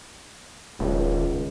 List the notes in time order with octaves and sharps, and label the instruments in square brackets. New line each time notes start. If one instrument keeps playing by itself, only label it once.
[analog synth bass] D#1 [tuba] C#2